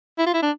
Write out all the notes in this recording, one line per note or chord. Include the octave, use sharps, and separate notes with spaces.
E4
F4
E4
D4